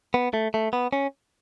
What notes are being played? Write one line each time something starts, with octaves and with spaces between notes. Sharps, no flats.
B3
A3
A3
B3
C#4